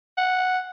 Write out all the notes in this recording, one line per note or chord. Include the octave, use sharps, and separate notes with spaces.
F#5